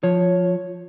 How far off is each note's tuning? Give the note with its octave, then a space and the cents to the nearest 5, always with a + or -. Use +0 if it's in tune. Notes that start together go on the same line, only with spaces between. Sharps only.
F3 +10 C#5 +0